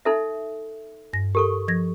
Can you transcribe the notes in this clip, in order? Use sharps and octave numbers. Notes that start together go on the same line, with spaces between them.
D#4 A4 E5
G2 A#6
G4 A4 A#4 C#6
F3 G#6 A#6